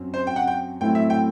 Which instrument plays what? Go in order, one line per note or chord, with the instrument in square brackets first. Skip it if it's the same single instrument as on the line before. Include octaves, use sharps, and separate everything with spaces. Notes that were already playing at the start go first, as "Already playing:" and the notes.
Already playing: [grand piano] F#2 F#3 C4
[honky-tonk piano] C5
G5
F#5
G5
[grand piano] A2 F#3 A3 C4 E4 [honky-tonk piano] G5
[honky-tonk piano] E5
G5